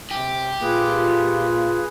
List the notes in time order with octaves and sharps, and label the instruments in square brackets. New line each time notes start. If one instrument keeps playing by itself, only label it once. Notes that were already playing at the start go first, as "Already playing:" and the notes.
[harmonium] C3 [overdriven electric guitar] G4
[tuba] A#2 [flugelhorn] F4 [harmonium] G#4 B4